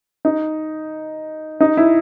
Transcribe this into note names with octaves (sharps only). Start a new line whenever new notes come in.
D#4
D#4
E4